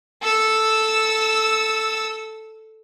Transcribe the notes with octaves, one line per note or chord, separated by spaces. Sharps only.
A4 E6